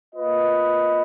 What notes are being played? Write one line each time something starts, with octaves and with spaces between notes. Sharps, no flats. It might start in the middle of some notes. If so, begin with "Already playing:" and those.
A#3 F4 B4 D#5